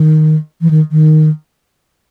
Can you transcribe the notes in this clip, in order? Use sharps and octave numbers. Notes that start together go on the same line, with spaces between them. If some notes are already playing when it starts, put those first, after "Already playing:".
Already playing: D#3
E3
D#3
D#3